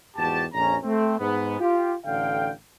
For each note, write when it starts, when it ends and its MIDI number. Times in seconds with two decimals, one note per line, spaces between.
0.17 0.45 40
0.17 0.45 44
0.17 0.45 66
0.17 0.45 67
0.17 0.45 81
0.53 0.76 34
0.53 0.76 41
0.53 0.76 61
0.53 0.76 82
0.83 1.16 57
0.83 1.16 60
1.19 1.57 44
1.19 1.57 59
1.60 1.95 65
1.60 1.95 67
2.05 2.51 33
2.05 2.51 50
2.05 2.51 77
2.05 2.51 79